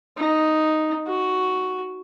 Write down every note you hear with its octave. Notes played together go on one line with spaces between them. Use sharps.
D#4
F#4